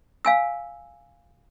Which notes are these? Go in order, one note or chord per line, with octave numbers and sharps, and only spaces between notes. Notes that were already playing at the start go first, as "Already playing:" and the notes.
F5 G#5 E6